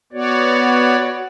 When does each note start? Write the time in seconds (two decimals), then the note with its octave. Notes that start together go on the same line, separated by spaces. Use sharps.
0.13 B3 F#4 C#5 D5